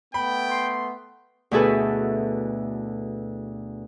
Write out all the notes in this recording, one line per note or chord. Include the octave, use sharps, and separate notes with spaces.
A3 B3 G5 B5
C6
D2 B2 E4 G#4 A4 B4